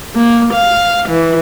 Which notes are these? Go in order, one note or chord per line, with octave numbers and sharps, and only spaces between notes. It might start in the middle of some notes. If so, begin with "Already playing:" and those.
A#3
F5
E3